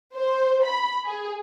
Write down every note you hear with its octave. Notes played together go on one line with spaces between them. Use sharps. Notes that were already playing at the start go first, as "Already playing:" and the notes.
C5
B5
G#4